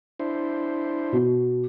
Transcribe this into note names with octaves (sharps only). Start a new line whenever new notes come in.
D4 E4 C5
B2